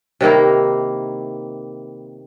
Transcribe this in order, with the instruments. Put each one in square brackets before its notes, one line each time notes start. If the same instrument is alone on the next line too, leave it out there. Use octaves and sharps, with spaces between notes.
[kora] C3 D#3 A#3 E4